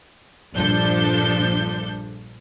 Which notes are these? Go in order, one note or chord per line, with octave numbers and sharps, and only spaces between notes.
A#1 G2 F3 D4 A4 G6